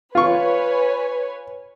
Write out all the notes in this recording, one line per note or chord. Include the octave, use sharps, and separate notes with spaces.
F4 B4 C#5 G#5 C#6